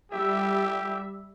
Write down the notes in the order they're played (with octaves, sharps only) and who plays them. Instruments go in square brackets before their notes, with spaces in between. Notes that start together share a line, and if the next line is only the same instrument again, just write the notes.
[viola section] G3 E5 [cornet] G4